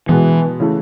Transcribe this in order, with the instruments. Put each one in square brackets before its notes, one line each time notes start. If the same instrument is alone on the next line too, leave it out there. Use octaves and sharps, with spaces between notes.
[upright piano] B2 G#3 B3 [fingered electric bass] E3
[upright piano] C#3 E3 A3